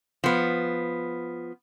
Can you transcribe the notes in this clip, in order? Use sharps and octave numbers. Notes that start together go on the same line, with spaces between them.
F3 B3